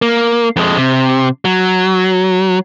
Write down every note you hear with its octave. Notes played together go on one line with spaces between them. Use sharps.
A#3
F2 G#3
C3
F#3